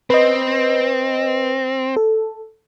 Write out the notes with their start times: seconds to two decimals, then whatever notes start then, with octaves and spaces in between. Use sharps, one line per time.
0.10 C4 B4 D#5
1.97 A4